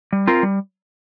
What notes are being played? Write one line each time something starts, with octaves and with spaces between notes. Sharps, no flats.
G3
C4 F4 A#4
G3